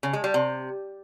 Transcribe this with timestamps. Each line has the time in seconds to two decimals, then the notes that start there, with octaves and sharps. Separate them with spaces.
0.03 C#3
0.13 G#3
0.24 G3
0.34 C3